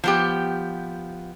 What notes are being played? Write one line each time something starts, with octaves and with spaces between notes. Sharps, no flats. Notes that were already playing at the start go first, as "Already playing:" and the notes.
F3 B3 G4